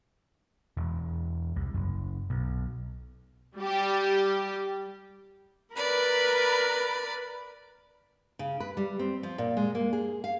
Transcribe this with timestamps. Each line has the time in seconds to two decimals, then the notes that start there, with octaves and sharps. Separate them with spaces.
0.77 E1
1.56 C2
1.74 F#1
2.30 B1
3.56 G3 G4
5.75 A#4 B4 D5 B5
8.39 C#3
8.60 B4
8.77 G3
8.99 C4
9.23 F3
9.38 A#2
9.57 G#3
9.75 A#3
9.93 G#4
10.24 F5